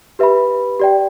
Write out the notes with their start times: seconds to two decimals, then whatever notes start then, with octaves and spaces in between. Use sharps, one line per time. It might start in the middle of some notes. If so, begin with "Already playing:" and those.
0.19 G4 B4 E5 B5
0.80 G4 D5 G5